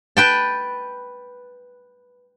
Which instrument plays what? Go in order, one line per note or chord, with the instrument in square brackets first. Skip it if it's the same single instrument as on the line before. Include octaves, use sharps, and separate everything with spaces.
[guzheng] B4 G5 A5